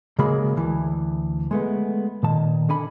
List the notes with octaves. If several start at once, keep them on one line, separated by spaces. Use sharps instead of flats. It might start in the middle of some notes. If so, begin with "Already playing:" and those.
C#3 G#3 A#3 F#4 G#4 B5
D2 E3
G#3 A3 B3
A#2 D#3 A5
D3 G#5 B5